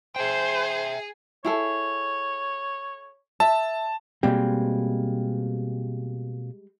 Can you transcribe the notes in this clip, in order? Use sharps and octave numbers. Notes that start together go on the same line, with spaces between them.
G#4 C5 E5 G5
E4 G#4 A4 C#5
E5 A5
B2 G3 G#3 A#3 C4